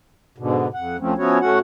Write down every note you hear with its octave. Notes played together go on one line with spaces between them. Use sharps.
G#2 B2 D3
F2 F#5
D2 F3 A3 C4 C#4
F3 B3 C#4 E4 F#4 C#5
A2 A3 C#4 F#4 F#5